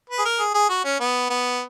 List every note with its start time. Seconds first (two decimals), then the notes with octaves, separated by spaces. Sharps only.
0.10 B4
0.19 G#4
0.25 A#4
0.39 G#4
0.54 G#4
0.69 F#4
0.85 C#4
1.00 B3
1.30 B3